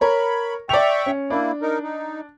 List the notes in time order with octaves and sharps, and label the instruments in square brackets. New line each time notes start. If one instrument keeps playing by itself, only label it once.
[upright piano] A#4 C#5 [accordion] B5
[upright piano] D5 F7 [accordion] E5 G5 C#6
[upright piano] C#4
[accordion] A#3 E4 [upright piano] D4
[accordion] D#4 A#4
D#4